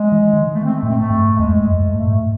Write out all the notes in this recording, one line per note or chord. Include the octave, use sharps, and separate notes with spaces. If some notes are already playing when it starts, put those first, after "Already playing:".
Already playing: G#3
E3
D#3
A3
C4
A3
A2
C4
A3
G#2
E2 G#3
F#2 A3
G#2 A3
A2
G#2